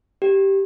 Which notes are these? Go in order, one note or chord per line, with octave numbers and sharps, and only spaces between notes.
G4